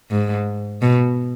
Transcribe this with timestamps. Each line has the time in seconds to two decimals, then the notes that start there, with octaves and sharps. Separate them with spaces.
0.11 G#2
0.82 B2